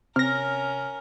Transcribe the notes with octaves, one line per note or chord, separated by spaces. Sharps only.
C3 C#4 A#4 F6 A#6